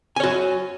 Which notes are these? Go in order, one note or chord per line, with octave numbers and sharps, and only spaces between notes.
F#4 C#5 G#5